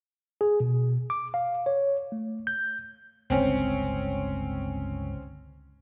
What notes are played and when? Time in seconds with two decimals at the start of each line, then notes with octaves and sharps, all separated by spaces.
0.41 G#4
0.60 B2
1.10 D6
1.34 F5
1.66 C#5
2.12 A3
2.47 G6
3.30 G1 C#2 C4 C#4